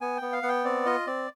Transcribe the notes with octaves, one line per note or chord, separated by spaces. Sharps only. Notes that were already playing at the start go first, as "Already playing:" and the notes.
B3 G#5
B3 G5
F5
B3 F#5
G5
C4 D5
F4 D#5
C4 D5